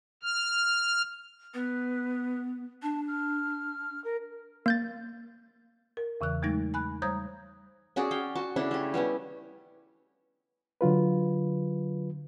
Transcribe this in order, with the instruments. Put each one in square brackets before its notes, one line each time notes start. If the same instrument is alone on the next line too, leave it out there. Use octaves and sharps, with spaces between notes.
[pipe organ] F6
[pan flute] B3 [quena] B4
[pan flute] D4 [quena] A5
[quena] F6
A#4
[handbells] A#3 G6 A6
[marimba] A#4
E2 C#3 E3 F#6
F#3 G#3 A3 D#4 A#6
G#5 B5 F#6
G3 C5 C#5 A#5 D#6 G#6
[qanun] C#4 F#4 G#4 D5
F5 G5
F#4 A5
C#3 D4 E4 A4
A3 G4
G3 B3 C#4 E4
[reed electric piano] D3 F#3 F4 B4